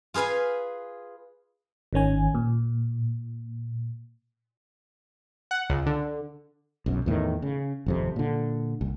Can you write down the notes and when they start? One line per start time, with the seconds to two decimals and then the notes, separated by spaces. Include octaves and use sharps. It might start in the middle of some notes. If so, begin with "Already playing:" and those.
0.14 F4 G#4 B4 F5 G#5
1.93 G#1 D#3 C#4 G#5
2.35 A#2
5.51 F#5
5.70 C#2
5.86 D3
6.86 B1 F#2
7.06 E2 A2 C3 D#3
7.42 C#3
7.86 G#1 F2 C3
8.16 A#2 D3
8.81 C2